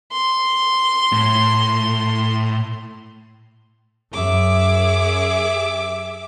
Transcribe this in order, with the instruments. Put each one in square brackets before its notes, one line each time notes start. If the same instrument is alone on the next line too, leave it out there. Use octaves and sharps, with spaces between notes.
[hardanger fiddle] C6
[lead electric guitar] A2
[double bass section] F#2 [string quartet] G#4 E5 D6